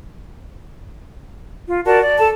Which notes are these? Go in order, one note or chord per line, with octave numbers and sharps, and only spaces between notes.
F4
F#4 A#4 D5 A5
D5
A4 A5